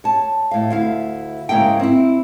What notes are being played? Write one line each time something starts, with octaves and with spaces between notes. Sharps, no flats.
C#5 A5
A2 F5
D2 E4 F5
G#2 C#3 A#3 E4 G5
C4 E4